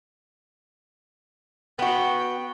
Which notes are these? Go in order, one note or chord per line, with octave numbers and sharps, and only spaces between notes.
B3 F#4 G5